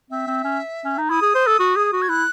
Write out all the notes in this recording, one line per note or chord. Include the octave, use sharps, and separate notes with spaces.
C4 E5
C4
C#4
C#4
D#4
E4 D#6
G#4
C5
A4
F#4
G#4
F#4
G#6
E4 F#6